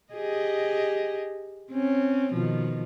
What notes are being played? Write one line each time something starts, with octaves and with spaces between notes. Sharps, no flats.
G4 G#4 D#5
C4 C#4
B2 D#3 F3